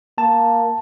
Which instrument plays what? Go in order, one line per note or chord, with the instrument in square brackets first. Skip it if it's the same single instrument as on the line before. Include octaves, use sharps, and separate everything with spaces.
[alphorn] A#3 [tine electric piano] A5